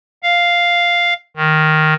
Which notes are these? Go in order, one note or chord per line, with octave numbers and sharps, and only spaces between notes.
F5
D#3